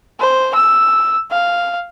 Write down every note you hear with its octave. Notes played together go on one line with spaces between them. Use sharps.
C5
E6
F5